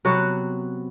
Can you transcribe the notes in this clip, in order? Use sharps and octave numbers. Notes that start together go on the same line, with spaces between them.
C3 F#3 B3 F#4